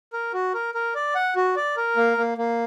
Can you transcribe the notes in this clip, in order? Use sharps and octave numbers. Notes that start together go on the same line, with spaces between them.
A#4
F#4
A#4
A#4
D5
F#5
F#4
D5
A#4
A#3
A#3
A#3